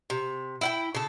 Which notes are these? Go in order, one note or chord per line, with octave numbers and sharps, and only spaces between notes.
C3
E4 F#5 G5
C#3 A4